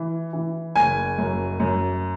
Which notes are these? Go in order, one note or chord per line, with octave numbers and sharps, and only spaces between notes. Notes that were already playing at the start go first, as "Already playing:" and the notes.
Already playing: E3
E3
F#1 G#5
F#2
F#2